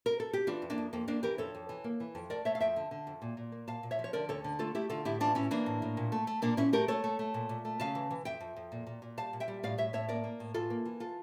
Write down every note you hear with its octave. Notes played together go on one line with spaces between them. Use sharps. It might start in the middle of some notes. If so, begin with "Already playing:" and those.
A#4
A4
G4
E3 D4 F4
F2
A#3 D4
F2
F2 A#3
F2 A#3 D4
E3 G4 A#4
F2 A4 C#5
F2
E3
A#3
E3
F2
A3 A#4 D5
A3 C#5 E5
F5
F2 E5 G5
D3
D3
F2
A#2
A#2
A#3
A#2 F5 A5
A#2
C#5 E5
F3
C#5
D3 A#4 D5
D2 A4 C#5
D3
A3 F4 A4
A3 E4 G4
D3 F4 A4
A2 E4 G4
E3 D4 F4
A2 C#4 E4
E3 A#3 D4
A2
A2
A#2
A3
A3
A#2 A#3 D4
A#2 C#4 E4
A3 G4 A#4
A3 A4 C#5
A3
A3
A#2
A#2
A3
C#3 F5 A5
E3
E3
F2 E5 G5
F2
F2
A#2
A#2
A#2
G3 F5 A5
A#2
E5 G5
G3
A2 D5 F5
A2 C#5 E5
A2 C#5 E5
A#3 A#4 D5
A#3
A2
E3 F4 A4
A#3
E3
F4 A4